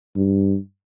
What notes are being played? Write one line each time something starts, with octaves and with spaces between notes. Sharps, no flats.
G2